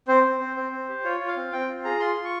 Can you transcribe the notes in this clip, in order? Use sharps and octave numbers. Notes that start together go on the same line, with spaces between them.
C4 C5
C4
C4
C4
C4
G4
F4 C#5
F4
F5
C4
C4 G5
F4
G#4 A#5
F4 C6
F4
C#6